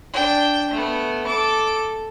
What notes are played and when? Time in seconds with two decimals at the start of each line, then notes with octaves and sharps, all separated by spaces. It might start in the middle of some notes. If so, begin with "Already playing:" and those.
0.13 D4 G5
0.71 A3 B3
1.26 A4 D6